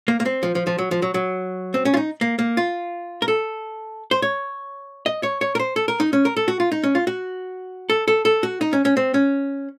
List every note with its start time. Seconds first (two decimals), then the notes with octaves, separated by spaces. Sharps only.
0.08 A#3
0.20 A#3
0.26 C4
0.43 F3
0.55 F3
0.67 F3
0.78 F#3
0.91 F3
1.02 F#3
1.14 F#3
1.74 C4
1.85 C#4
1.94 F4
1.97 D#4
2.21 A#3
2.39 A#3
2.57 F4
3.22 A#4
3.28 A4
4.11 C5
4.22 C#5
5.06 D#5
5.23 C#5
5.41 C#5
5.55 A#4
5.59 C5
5.76 A4
5.88 A#4
6.00 D#4
6.13 C#4
6.25 A#4
6.37 A4
6.48 F#4
6.60 F4
6.72 D#4
6.83 C#4
6.95 F4
7.07 F#4
7.90 A4
8.08 A4
8.25 A4
8.43 F#4
8.61 D#4
8.73 C#4
8.85 C#4
8.97 C4
9.14 C#4